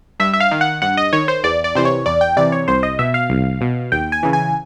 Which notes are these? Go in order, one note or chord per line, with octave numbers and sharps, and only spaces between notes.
G2 E5
E5
F5
D#3
F#5
G2 F#5
D#5
D#3 C#5
C5
E2 D5
D5
C3 E3 C5
C#5
E2 D5
G5
C3 E3 D5
C#5
C2 C5
D#5
B2 E5
F5
C2
B2
D#2 G5
G#5
C#3 E3
G#5